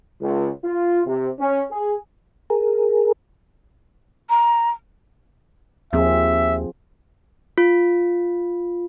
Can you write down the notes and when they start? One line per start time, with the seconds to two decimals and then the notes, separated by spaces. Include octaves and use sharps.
0.21 C#2
0.64 F4
1.06 C3
1.39 C#4
1.71 G#4
2.50 G#4 A#4
4.30 A#5
5.93 D#2 F3 C4 G#4 E5
7.58 F4